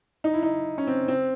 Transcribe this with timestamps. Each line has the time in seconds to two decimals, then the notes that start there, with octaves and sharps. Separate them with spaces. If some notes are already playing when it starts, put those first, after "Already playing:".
0.24 D#4
0.33 E4
0.43 D#4
0.78 C#4
0.87 C4
1.08 C4